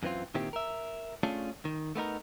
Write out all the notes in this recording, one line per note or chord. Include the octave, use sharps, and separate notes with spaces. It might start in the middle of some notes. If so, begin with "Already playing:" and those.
F#2 E3 C4 F4
A#2 D#3 C4 E4 G4
A#4 E5
A3 C#4 D4 F4 G#4
D#3
A3 B3 D#4 A#4